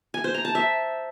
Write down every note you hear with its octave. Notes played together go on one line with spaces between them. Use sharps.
G#5
C5
A#5
A5
E5